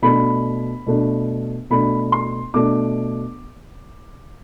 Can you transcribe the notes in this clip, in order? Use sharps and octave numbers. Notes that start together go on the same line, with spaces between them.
B2 A3 D4 B5
B2 A3 D4
B2 A3 D4 B5
C6
B2 A3 D4 D6